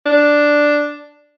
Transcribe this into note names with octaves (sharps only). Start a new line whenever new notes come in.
D4